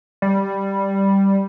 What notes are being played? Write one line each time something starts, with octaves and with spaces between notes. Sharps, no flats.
G3